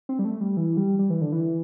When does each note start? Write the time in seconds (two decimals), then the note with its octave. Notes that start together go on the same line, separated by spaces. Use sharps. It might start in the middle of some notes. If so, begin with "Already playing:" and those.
0.09 C4
0.19 G3
0.25 A3
0.41 G3
0.57 E3
0.77 G3
0.99 G3
1.10 E3
1.21 D3
1.32 E3